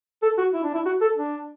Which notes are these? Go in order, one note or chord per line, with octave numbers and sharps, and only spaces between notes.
A4
F#4
E4
D4
E4
F#4
A4
D4